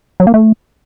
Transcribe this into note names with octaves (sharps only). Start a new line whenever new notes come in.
F#3
A#3
A3